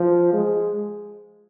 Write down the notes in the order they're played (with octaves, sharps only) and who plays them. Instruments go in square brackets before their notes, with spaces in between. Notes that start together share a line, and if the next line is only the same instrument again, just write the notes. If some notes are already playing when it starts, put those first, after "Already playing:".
Already playing: [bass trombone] F3
G#3